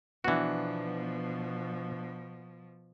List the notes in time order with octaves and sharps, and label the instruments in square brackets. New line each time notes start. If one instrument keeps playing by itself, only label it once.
[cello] B2 F3 [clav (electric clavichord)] E3 F#4 [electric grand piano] B3 D4